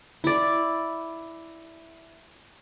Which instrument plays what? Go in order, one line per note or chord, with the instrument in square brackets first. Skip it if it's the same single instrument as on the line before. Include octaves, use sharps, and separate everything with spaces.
[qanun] E4 D5